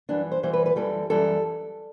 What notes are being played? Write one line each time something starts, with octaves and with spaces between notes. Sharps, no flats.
F#2 E3 G3 D4
C5
F#2 E3 G3 C5
B4
B4
F#2 E3 G3 A4
F#2 E3 G3 A4